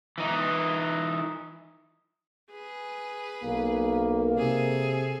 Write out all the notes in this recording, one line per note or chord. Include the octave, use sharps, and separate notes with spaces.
E3 D#4
G#4 B4
B1 A#3
C3 G#4 A4